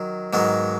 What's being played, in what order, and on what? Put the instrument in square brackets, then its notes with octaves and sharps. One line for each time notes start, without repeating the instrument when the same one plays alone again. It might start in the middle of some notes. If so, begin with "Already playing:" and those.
Already playing: [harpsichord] D#3 F#3
G#2 D#3 F#3 B3